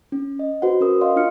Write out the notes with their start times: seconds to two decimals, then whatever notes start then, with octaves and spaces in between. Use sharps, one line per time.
0.12 C#4
0.39 D#5
0.62 F#4 B4 C5 F#5
0.80 C#4 A#4 D#6
1.01 C#5 D#5 F5 C6
1.16 D4 F4 F6 C#7